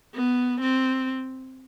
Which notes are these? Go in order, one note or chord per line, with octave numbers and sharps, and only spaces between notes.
B3
C4